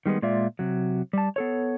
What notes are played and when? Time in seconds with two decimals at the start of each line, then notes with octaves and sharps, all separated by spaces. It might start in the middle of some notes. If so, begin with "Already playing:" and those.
0.06 D#3 G3 G#3 B3
0.22 A#2 G#3 F4 D5 E5
0.59 C3 F#3
1.13 G3 A5
1.36 B3 A4 C#5